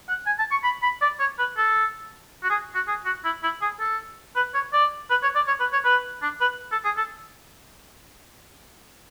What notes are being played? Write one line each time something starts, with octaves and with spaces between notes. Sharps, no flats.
F#5
G#5
A5
C#6
B5
B5
D5
C#5
B4
A4
F#4
G#4
F#4
G#4
F#4
E4
E4
G#4
A4
B4
C#5
D5
B4
C#5
D5
C#5
B4
C#5
B4
D4
B4
A4
G#4
A4